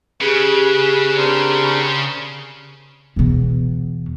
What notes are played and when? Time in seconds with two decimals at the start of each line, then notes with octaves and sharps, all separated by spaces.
0.21 C#3 G4 G#4 B4
1.17 C4 D4 A#4
3.16 E2 B2